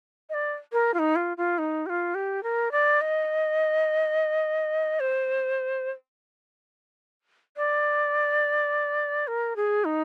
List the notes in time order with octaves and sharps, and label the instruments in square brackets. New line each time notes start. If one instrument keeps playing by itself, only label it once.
[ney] D#5
D5
A#4
F4
D#4
F4
F4
D#4
G4
F4
G4
A#4
D5
D#5
C5
D5
A#4
G#4
D#4